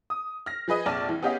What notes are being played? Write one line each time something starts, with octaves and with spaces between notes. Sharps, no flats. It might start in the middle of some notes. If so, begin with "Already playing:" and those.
D#6
F6 A#6
F3 G#4 B4 D#5
F1 A#1 D5 A5 F6
E3
B3 C#4 G4 G#4 D#5 F5